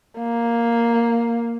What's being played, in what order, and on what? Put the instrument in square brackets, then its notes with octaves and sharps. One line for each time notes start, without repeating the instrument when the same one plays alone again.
[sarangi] A#3